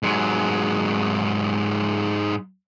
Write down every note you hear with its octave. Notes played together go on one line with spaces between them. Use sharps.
G#2 F#3